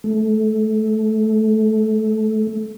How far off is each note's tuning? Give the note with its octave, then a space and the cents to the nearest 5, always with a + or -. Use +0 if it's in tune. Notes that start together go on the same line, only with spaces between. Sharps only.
A3 -20